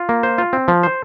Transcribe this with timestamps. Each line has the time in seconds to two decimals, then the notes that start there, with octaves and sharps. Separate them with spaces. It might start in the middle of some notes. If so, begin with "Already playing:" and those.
Already playing: F4
0.09 A#3
0.23 C5
0.38 F4
0.53 C4
0.68 F3
0.83 C5